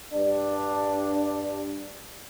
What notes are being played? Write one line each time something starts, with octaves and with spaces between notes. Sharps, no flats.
G2 D4